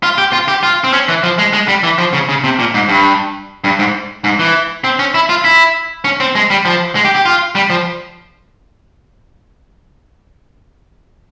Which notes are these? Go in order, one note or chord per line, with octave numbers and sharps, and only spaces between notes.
F4
G4
F4
G4
F4
C4
C#4
E3
F3
G#3
G#3
G3
E3
F3
C#3
C#3
C3
A#2
G#2
G2
G2
G#2
G#2
E3
C4
C#4
E4
F4
E4
C#4
C4
G#3
G3
F3
G#3
G4
G4
F4
G3
F3